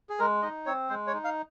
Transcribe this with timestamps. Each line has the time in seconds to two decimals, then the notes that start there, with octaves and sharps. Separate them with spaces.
0.09 G#4
0.19 G#3 A#4
0.43 D#4 D#5
0.66 C4 C#5
0.89 G#3 C5
1.07 C#5
1.14 D#4
1.24 F5